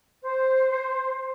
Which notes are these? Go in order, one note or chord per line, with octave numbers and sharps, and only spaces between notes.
C5